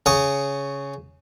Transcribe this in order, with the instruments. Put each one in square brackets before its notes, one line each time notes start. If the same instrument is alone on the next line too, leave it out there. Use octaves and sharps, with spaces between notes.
[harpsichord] C#3 C#6 D#6